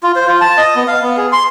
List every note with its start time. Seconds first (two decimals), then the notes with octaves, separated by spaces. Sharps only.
0.03 F4
0.16 C5
0.27 F4
0.41 A5
0.57 D#5
0.76 B3
0.88 F5
1.02 B3
1.17 G#4
1.33 C6